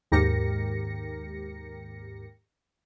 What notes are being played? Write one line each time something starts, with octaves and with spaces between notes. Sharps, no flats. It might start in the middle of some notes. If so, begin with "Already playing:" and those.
D#2 G#2 G4 A#4 A#6 C#7